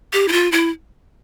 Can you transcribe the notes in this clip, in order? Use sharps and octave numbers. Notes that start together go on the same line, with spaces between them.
G4
E4
F4
E4